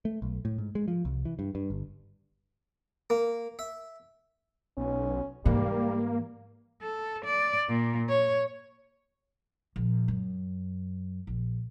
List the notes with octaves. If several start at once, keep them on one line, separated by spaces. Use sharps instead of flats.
A3
B1
A2
G#2
G#3
F3
C2
E3
G2
G2
G1
A#3
E5
B1 C#4
G#2 E3 G3 A#3
A4
D5
A#2
C#5
A#1
F#2
A#1